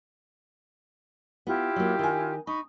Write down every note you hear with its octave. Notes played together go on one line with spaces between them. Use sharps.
B3 E4 F4 G4
F#3 A#3
D#3 G#5
D#4 B5 C#6